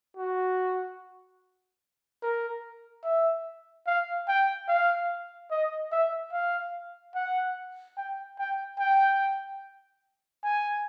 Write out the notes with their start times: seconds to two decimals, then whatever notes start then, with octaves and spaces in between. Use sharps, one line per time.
0.17 F#4
2.22 A#4
3.04 E5
3.86 F5
4.28 G5
4.68 F5
5.51 D#5
5.91 E5
6.32 F5
7.15 F#5
7.97 G5
8.38 G5
8.79 G5
10.43 G#5